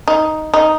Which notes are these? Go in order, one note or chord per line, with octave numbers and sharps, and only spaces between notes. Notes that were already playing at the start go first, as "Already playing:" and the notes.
D#4
D#4